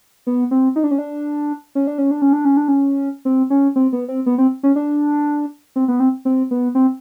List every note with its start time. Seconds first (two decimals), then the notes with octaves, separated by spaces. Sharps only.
0.27 B3
0.51 C4
0.76 D#4
0.84 D4
0.91 C#4
0.98 D4
1.75 C#4
1.87 D4
1.98 C#4
2.11 D4
2.22 C#4
2.33 D4
2.45 C#4
2.57 D4
2.68 C#4
3.25 C4
3.50 C#4
3.76 C4
3.93 B3
4.08 C4
4.26 B3
4.38 C4
4.63 C#4
4.76 D4
5.76 C4
5.88 B3
6.00 C4
6.25 C4
6.51 B3
6.75 C4